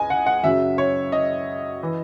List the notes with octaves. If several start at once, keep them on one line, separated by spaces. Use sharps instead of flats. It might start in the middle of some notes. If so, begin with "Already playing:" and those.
Already playing: C#2 D#5 G#5
F#5
F#5
F#2 C#3 F#3 E5
C#5
D#5
E3